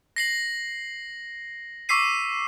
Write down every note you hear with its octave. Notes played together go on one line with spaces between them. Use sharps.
A#6 C7 F#7
C#6 D6 E6 B6 C7 D#7